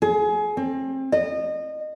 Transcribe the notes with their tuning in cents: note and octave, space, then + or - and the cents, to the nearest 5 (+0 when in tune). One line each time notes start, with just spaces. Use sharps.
G#4 +25
C4 +30
D#5 -25